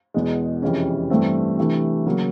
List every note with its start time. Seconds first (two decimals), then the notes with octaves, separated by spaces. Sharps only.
0.14 E2 B2 G#3
0.62 F2 C3 E3 G#3 C#4
1.10 G2 E3 A3 C4
1.57 C3 E3 A3 D4
2.06 C#3 F#3 A#3